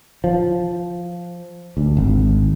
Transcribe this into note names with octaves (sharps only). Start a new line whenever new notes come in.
F3
D2
G#1